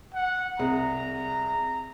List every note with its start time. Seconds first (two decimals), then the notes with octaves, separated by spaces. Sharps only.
0.14 F#5
0.59 C2 G#4 A#5